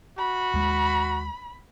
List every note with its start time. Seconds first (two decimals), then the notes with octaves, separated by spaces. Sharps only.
0.19 F#4 B5
0.54 D#2 G#3